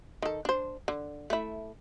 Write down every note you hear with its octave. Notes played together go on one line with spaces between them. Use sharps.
D#3 A4
D4 C5
D3
A3 E4